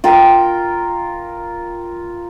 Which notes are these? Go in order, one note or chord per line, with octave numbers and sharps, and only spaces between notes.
F4 A#4 G5